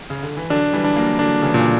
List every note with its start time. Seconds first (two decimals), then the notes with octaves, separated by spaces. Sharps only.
0.10 C#3
0.23 D3
0.37 E3
0.50 D3 F#3 D4
0.73 E3 G3
0.84 D4
0.96 F#3 A#3
1.19 D3 F#3 D4
1.38 F#3
1.42 C#3 E3
1.54 A#2 F#3